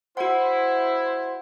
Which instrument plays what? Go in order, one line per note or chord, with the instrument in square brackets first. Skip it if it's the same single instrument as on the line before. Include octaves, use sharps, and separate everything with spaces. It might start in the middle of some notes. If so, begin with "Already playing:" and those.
[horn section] E4 [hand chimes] F#4 F#5 [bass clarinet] C5